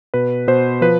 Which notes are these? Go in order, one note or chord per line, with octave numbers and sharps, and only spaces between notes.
B2 B4
B2 C5
F3 B4